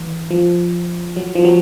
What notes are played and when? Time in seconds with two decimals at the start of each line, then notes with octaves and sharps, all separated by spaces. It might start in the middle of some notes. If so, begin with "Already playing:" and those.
Already playing: E3
0.31 F3
1.16 F#3
1.35 F3
1.45 F#3